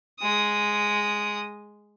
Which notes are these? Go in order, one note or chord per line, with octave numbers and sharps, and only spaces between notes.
G#3 D#6